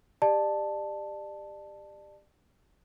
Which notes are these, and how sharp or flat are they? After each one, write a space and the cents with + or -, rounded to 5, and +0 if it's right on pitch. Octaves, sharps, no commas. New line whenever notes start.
G4 +20 D5 +30 A5 +0